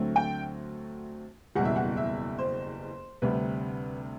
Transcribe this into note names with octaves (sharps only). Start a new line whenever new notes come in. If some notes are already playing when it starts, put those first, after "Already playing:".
Already playing: D2 D3 F#3 A3 C4
G5
F#1 E2 B2 G3 F#5
E5
F#5
E5
C5
D2 C3 G3 B4